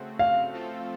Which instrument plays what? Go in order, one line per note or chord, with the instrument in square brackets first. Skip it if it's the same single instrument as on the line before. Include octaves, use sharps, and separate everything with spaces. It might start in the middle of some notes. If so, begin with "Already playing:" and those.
Already playing: [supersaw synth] C#3 A3 C4 F#4
[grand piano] F5
[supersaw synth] F3 A3 C4 F4 A4